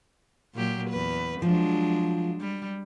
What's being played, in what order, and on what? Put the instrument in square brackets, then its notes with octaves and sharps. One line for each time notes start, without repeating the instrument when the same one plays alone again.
[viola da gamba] A#2 F#3 G4
E2 B4
[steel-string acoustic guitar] F3 [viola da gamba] F#3 G#3 D4
[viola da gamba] G3